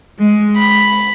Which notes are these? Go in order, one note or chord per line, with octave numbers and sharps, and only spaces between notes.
G#3
B5